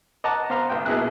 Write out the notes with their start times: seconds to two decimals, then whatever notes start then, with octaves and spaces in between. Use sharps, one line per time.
0.24 D#5 F#5 A5 A#5 D6
0.50 B3 C5 F5 A#5
0.70 B1 G5
0.85 A#1 B2 E4 G#4 F#6